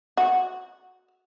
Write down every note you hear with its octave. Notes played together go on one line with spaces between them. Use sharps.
F#4